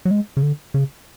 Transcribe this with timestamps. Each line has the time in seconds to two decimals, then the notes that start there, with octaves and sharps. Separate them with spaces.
0.05 F#3
0.11 G#3
0.37 C#3
0.43 D3
0.74 C#3